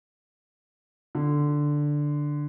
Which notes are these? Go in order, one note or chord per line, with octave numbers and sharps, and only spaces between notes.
D3